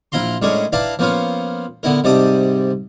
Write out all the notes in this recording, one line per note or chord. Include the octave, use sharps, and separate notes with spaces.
A#1 E4 F4 A#5 C6
A2 G#3 C#4 D4 G#4 A#4
D4 E4 B4 F5 A5 A#5
F3 A#3 B3 C#4 F4
D3 B3 E4 A#4
G#2 C3 G3 D5 A5 D#6